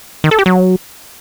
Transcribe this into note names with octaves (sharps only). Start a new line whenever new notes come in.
D#3
A4
G4
F#3